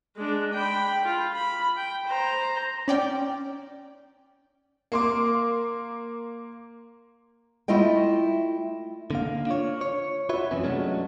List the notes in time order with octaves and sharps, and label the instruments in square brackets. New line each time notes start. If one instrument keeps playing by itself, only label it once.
[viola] G#3 D4
G5 B5
F4
B5
G5
C5 A#5
[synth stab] C#4 D5 G5
[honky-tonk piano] A#3 C6 D6
[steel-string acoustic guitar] A3 E4 F4 D#5 G5
[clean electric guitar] D3 A#3 F5
D4 F4 C#5
C#5
F4 F#4 B4 C#5 E5
F#2 C3 E3 B3 C#4
F#3 G#3 A3 B3 C#4 D4